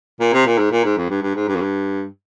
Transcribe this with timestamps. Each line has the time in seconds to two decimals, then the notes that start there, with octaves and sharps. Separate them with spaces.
0.20 A#2
0.33 C3
0.47 A#2
0.58 G#2
0.71 A#2
0.84 G#2
0.97 F2
1.10 G2
1.23 G2
1.36 G#2
1.48 G2
1.55 F2
1.61 G2